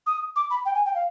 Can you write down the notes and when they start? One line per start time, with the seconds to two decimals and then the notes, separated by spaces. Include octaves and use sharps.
0.07 D#6
0.36 D6
0.50 B5
0.65 G5
0.75 G#5
0.85 G5
0.95 F5